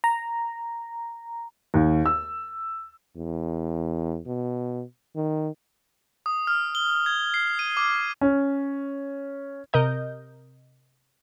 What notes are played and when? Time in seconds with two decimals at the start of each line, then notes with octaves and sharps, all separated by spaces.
0.04 A#5
1.74 D#2
2.06 E6
3.16 E2
4.27 B2
5.16 D#3
6.26 D#6
6.47 F6
6.75 G7
7.06 G#6
7.34 C7
7.59 D#7
7.77 D6
8.21 C#4
9.73 C3 A#4 D#5 G6